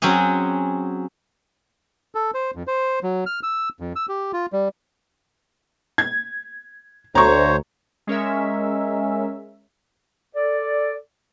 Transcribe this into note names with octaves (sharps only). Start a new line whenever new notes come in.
F#3 C4 C#4 F#4 G#4
A4
C5
F2
C5
F#3
F6
E6
F2
E6
G4
F4
G3
G#6
D2 C5 C#5 A#5 C#6
G#3 C#4 A#4 E5
A4 D5